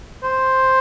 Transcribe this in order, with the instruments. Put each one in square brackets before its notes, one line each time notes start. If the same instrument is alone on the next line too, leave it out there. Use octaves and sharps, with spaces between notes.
[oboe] C5